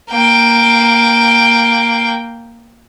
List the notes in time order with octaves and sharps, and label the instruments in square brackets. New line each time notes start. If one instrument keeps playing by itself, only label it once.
[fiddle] A#3 G5